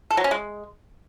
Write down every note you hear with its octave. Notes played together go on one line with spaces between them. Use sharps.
A4
F#3
C#4
G#3